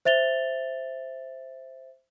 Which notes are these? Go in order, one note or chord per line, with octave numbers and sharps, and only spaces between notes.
C5 E5 A6 F7 G7